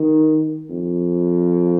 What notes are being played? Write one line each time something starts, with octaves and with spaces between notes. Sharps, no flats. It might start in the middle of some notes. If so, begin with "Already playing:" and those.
Already playing: D#3
F2